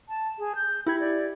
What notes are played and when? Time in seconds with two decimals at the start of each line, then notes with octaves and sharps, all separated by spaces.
0.09 A5
0.39 G#4
0.56 G6
0.87 E4 G4 B5 G#6
1.00 D5